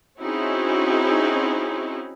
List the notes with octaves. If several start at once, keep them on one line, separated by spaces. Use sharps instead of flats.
C4 C#4 D#4 E4 F#4 G#4